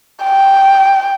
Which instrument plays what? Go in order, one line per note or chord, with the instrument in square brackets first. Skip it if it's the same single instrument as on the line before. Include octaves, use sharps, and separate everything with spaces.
[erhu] G5